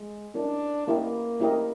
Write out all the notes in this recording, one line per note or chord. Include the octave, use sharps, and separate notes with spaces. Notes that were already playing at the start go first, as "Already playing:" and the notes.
Already playing: G#3
C#4 D4 E4 G4 A#4 D#5
A#3 C#4 E4 G4 A#4 D#5
C#4 E4 G4 A#4 D#5